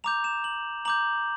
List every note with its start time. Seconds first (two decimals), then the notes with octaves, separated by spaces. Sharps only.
0.04 A#5 D6 G6 F7
0.24 E7
0.44 F#7
0.85 A#5 D6 G6 F#7